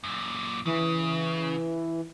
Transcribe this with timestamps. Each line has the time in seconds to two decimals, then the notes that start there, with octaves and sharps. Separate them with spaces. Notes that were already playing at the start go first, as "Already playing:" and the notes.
0.04 F#2 A#2
0.66 C#3 E3